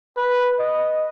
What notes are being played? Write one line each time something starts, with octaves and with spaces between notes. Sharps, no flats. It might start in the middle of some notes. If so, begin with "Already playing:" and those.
B4
D#5